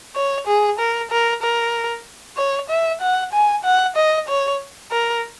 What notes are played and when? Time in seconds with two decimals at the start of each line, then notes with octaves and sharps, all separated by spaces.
0.16 C#5
0.47 G#4
0.79 A#4
1.11 A#4
1.43 A#4
2.37 C#5
2.70 E5
3.01 F#5
3.33 G#5
3.64 F#5
3.96 D#5
4.28 C#5
4.91 A#4